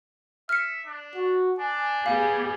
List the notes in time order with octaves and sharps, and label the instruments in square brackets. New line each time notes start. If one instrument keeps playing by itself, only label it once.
[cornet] E5 [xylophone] F6 C#7
[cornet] D4
[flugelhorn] F#4
[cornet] D4 [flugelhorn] G#5
[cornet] G3 [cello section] B3 G4 G#4 [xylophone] F5